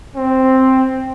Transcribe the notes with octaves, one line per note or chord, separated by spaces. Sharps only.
C4